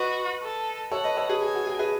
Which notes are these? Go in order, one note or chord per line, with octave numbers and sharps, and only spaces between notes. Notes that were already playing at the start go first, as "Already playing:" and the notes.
Already playing: F#4 B4 D#5
A4
A4 C#5 F#5
B4 D#5
A4 C#5
G#4 B4
G#4 G#5
F#4
G#4
G#4 B4